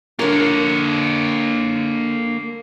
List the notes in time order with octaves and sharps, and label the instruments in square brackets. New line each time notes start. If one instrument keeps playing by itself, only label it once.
[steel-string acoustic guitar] D3 A#4 [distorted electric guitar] A#3 C#5